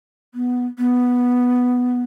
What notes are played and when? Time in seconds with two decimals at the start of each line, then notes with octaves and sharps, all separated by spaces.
0.34 B3
0.79 B3